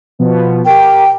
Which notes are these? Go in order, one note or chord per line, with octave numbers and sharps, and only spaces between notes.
B2 F3 B3
G4 A#4 G5